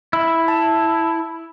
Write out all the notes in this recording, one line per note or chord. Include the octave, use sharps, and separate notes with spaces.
E4
A5